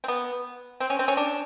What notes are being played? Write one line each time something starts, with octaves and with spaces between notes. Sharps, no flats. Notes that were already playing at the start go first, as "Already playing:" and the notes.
C4
B3
C4
C#4
C4
C#4
D4